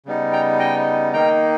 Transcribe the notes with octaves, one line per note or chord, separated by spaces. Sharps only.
C#3 G3 B3 D#4
G5 A#5
D#5 G5
D#3 A#3 D#4 G5 A#5